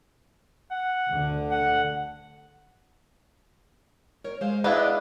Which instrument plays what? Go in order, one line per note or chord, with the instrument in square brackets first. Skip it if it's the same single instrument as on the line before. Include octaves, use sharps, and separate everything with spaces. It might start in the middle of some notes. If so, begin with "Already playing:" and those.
[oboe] F#5
[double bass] D2 D3
[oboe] F#5
[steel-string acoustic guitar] A#4 C#5
G#3 C5 F5
[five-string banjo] B3 D4 E4 [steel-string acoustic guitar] G#4 D#5 F5